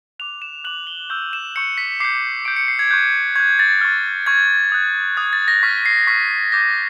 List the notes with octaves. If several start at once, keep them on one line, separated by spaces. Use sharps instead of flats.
D6 F#6 F7
E7
D6 F#6 F#7
G7
C#6 E6 G6
E7
C#6 E6 G6 C#7
B6
D6 G6 C7
D6 G6 D7
C#7
C7
G#6
C#6 F#6 G6
C#6 F#6 G#6
A6
C#6 F6
C#6 F6 G#6
D#6 F#6
D#6 F#6 G#6
A6
A#6
C#6 F6 B6
C7
C#6 F6 B6
D6 G6 A#6